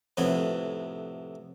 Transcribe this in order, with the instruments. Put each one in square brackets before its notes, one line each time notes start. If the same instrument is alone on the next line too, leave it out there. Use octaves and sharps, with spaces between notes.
[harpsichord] F2 A2 C3 B3 C#5